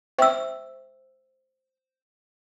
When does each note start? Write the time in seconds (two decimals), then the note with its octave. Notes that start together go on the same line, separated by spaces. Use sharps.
0.19 C5 E5 G5 C#6 E6